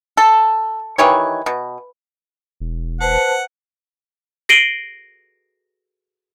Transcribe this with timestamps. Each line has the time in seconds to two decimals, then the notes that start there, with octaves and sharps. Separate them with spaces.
0.17 A4
0.98 D#3 E3 G4 C#5
1.46 B2
2.60 E1
3.01 B4 C5 F#5 A5
4.49 A#6 C7 D7 D#7 F#7 G7